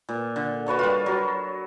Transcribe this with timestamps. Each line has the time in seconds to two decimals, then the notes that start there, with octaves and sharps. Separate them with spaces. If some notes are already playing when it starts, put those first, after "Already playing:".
0.09 A#2
0.36 D3
0.66 F#4 B4 C#5 A5
0.79 G3 F4
1.06 F#3